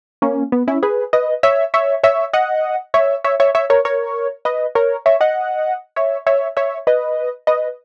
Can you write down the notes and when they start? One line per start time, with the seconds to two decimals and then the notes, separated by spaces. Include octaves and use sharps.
0.22 A#3 C#4
0.52 B3
0.68 C#4 E4
0.83 G#4 B4
1.13 B4 D#5
1.43 C#5 E5
1.74 C#5 E5
2.04 C#5 E5
2.33 D#5 F#5
2.94 C#5 E5
3.24 C#5 E5
3.40 C#5 E5
3.55 C#5 E5
3.70 A#4 C#5
3.85 A#4 C#5
4.45 B4 D#5
4.75 A#4 C#5
5.06 C#5 E5
5.21 D#5 F#5
5.96 C#5 E5
6.27 C#5 E5
6.57 C#5 E5
6.87 B4 D#5
7.47 B4 D#5